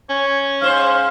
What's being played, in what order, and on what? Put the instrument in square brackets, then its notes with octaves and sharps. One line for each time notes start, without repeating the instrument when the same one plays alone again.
[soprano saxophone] C#4 [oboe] C#5
[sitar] G#2 C5 [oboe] F5